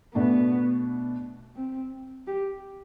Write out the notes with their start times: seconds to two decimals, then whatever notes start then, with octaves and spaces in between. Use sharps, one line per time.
0.15 B2 A3 B3 D4
1.56 C4
2.27 G4